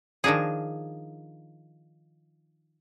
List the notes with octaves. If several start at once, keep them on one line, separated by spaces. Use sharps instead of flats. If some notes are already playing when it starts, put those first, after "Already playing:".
D#3 F3 D4 D#4 G#4